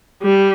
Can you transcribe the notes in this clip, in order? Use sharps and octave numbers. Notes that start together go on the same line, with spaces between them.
G3